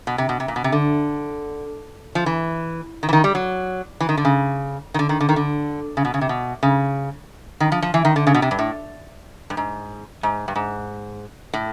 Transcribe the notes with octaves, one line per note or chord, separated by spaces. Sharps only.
B2
C3
B2
C3
A#2
B2
C3
D3
F3
E3
D#3
E3
D#3
G3
F#3
E3
D#3
D3
C#3
D#3
D3
D#3
D3
D#3
D3
C#3
B2
C#3
C3
B2
C#3
D#3
F3
F3
E3
D#3
D3
C#3
B2
C3
G2
A2
G2
G#2
G#2
G2
G#2
A2